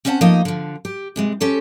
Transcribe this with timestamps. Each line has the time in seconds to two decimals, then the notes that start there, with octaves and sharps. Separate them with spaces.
0.05 C4 C#4 C5 C#5 F#5 A5
0.21 F3 A3 A#3 D#4 D#5
0.45 D3 F3
0.85 G4
1.16 C3 E3 G#3
1.41 C#4 G4 A4 C5